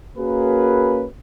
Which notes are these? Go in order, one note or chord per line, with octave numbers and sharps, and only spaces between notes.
A#3 C#4 F#4 G#4 A#4 B4